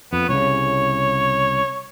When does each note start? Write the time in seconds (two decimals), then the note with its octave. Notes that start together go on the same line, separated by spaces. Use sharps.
0.13 F2 B3
0.29 C2 C#3 C#5